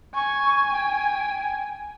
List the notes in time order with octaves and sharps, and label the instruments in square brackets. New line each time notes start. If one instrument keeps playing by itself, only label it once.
[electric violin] G#5 [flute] C#6
[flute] G5